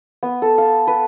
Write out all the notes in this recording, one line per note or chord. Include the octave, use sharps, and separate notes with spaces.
B3
A4
F5
B4